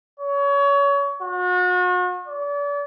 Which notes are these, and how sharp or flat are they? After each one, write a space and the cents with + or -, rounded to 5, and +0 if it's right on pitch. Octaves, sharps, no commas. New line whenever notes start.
C#5 +25
F#4 -40
D5 -40